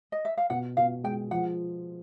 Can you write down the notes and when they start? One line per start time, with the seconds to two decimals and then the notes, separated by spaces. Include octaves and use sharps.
0.12 D#5
0.25 E5
0.37 F5
0.50 B2 F#5
0.77 B2 F5
1.04 G#3 G5
1.31 F3 F#5